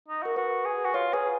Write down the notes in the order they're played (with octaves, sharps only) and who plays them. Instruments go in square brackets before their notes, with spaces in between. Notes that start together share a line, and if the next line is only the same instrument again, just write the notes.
[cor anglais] D#4
[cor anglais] F#4 [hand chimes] A#4
[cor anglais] F#4 [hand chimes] B4
[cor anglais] G#4
F#4
[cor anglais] F4 [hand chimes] C#5
[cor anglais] G#4 [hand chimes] B4